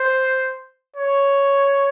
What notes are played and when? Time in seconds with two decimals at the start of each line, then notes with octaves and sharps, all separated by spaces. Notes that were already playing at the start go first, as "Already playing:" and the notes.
Already playing: C5
0.96 C#5